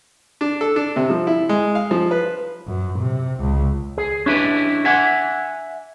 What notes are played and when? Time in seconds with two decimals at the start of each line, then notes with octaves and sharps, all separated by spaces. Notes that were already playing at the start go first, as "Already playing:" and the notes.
0.41 D4
0.61 A4
0.76 D4
0.96 C3
1.10 F3
1.27 E4
1.49 G#3
1.75 F5
1.91 F3
2.11 B4
2.67 F#2
2.99 C3
3.40 C#2
3.98 G#4
4.26 C#4 D4 E4 G4 B4
4.85 E5 F#5 G#5